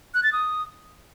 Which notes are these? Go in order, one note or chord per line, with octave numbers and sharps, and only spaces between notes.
F#6
A6
D#6